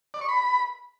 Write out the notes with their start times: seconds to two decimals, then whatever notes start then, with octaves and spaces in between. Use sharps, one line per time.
0.14 D5
0.21 C#6
0.29 B5